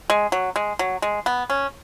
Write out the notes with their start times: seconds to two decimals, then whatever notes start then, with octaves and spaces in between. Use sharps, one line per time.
0.10 G#3
0.32 F#3
0.56 G#3
0.79 F#3
1.02 G#3
1.26 B3
1.50 C#4